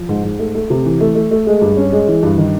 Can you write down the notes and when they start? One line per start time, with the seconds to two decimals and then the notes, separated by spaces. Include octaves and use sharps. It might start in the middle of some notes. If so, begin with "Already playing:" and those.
Already playing: F3
0.09 G#2
0.24 G#2
0.39 A3
0.55 A3
0.70 C3
0.85 E3
1.00 A3
1.15 A3
1.31 A3
1.46 G#3
1.61 G2
1.77 C#4
1.92 G#3
2.08 E3
2.23 G2
2.38 D#3